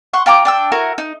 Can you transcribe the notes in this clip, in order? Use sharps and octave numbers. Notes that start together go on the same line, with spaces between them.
F#5 C6 C#6
F4 G5 A#5 D6
D4 G5 E6
E4 F#4 A#4
D#4